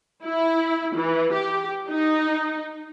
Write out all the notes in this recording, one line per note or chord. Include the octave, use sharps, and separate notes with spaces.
E4
E3
G4
D#4